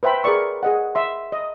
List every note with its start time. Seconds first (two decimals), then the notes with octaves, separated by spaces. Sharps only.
0.03 B4 C5 E5 G5 B5
0.23 G#4 A#4 B4 D5 C#6 E6
0.63 G#4 D#5 F#5
0.95 E5 C6
1.32 D#5